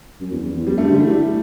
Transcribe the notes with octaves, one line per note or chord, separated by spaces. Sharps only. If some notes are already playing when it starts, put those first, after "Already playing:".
F#2
E2
E2
E2
F#2 G3
G2 A3
D3 G3
E3 A3
G3